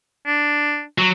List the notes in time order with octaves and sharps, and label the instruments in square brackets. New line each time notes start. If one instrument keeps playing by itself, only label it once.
[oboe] D4
[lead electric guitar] F#3